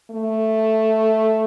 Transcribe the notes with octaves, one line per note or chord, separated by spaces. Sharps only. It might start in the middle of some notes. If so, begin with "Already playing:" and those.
A3